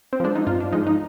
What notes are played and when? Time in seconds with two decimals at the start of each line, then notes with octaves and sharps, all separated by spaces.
0.13 C4
0.20 F3 G#3 D4
0.35 D#4
0.47 G2 F4
0.60 D4
0.73 F3 G#3 D#4
0.87 D#4